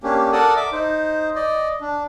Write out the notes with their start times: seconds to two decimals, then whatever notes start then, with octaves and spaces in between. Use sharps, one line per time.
0.03 A#3 C#4 D4 G4
0.32 A4 A#4 D5 F#5 A5 D#6
0.56 E5 D6
0.72 D#4 C5
1.36 D5 D#5
1.81 D4